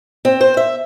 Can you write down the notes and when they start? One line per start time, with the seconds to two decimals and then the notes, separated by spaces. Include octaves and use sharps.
0.25 C4
0.41 C5
0.57 E5